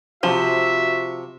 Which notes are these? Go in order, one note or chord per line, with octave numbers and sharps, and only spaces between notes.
C3 F3 F#4 E5